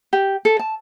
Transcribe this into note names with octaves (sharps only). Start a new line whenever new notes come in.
G4
A4
A5